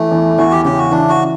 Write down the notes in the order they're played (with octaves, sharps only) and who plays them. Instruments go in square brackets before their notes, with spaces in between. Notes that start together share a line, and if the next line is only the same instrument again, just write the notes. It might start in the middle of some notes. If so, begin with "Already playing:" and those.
Already playing: [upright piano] E3 [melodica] A3
[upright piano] E2
[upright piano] E2 [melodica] F#4
[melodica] G4
[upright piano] C#3 [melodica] G4
[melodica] F#4
[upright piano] E3 [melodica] D4
[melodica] F#4